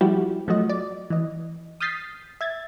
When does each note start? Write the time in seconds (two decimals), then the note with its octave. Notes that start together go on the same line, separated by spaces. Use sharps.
0.01 F3 G3 G#3 E4 F#4 G4
0.48 F3 F#3 A3 F#4 D#5
0.69 D5
1.10 E3 D#5
1.80 D#6 F6 G6 A6 B6 C7
2.41 E5 G#6 A6